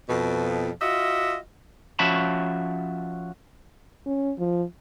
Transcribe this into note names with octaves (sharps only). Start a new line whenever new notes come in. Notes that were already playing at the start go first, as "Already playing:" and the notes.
F2 B2
F4 F#4 D#5 E5
F3 C#4 F#4 E5 A5 B5
C#4
F3